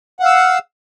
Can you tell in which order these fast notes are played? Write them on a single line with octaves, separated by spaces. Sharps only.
F#5 F5 E6